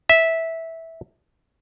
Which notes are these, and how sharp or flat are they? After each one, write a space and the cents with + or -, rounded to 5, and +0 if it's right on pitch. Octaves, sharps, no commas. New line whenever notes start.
E5 -10